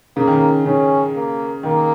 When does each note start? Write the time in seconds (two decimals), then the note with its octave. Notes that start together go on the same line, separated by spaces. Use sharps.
0.16 C#3 A#3
0.27 D#3
0.33 C#3
0.66 C#3 C#4
1.15 A#3
1.63 D#3 A#3